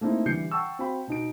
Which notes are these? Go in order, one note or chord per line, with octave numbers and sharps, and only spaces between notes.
A3 A#3 C4 D#4 E4
D3 E3 G3 G6 C7 C#7
F#5 G5 A5 C#6 E6
C4 F#4 F5 G5 B5
B2 D#4 D7